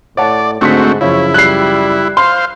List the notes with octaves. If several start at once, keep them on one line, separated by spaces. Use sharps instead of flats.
A2 C#5 D5 F#5 A5
G#2 D3 A3 C4 F#4 C#6 B6
F#2 C#3 F3 E4 C#5
G3 F#6 C7
C5 F5 C6